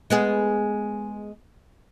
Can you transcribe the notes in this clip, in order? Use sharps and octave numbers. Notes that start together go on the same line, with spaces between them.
G#3 B3 G#4